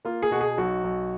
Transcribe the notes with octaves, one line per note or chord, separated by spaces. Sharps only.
A#3 F4
G#4
B2 F#4
G#4
B1 F#4
B1